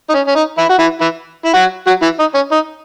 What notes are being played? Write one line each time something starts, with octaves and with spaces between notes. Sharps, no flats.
D#4
C#4
C#4
D#4
E3 E4
F#4
E3 E4
E3 E4
E4
F#3 F#4
F#3 F#4
E3 E4
D#4
C#4
D#4